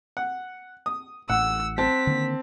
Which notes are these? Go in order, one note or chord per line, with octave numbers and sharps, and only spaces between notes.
F#5
D#6
A1 A2 F#5 E6
C4 A5 B6
D3 D#3 A#3